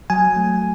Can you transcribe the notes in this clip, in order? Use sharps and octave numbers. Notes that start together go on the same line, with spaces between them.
F#3 G#5
A3